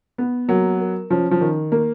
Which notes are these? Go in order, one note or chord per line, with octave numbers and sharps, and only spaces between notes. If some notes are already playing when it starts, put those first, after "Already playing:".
B3
F#3 A#3
A#4
F3 C#4
F3
D#3
A#3